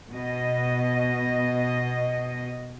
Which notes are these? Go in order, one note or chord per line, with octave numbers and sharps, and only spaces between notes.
B2 D#5